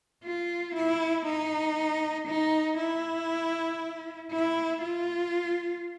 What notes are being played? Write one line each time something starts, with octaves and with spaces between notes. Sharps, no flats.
F4
E4
D#4
D#4
E4
E4
F4